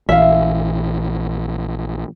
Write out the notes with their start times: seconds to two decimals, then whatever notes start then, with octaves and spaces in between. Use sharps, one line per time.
0.09 A#1 E3 E5 F5